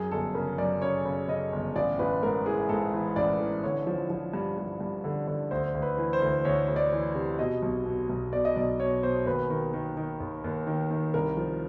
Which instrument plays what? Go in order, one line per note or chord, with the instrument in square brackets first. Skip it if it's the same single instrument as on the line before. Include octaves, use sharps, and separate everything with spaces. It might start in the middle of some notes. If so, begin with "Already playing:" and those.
Already playing: [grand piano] F#2 G#4
G1 A4
C#3 A#4
F#2 D5
C#3 C#5
C#3
C#3 D#5
G1
A1 D5
A1 B4
G#2 A#4
E3 G#4
G#2 A4
E3
A1 D5
E3
D3 C#5
F3
F3
G2
G2
G2
D3
D3
D2 C5
D2
B4
E3
C5
D2
D2 C#5
D2
D5
E3
C3
B2 D#5
B1
B2
B1
B2 D5
D#5
B1 D5
B2 C#5
B2 C5
D#2 B4
D#3
D#3
D#3
D#2
D#2
D#3
D#3
C2 A#4
F3